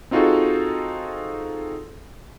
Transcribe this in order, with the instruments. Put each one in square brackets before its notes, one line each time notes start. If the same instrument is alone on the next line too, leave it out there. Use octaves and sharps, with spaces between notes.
[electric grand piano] C4 D#4 F4 F#4 G#4 A4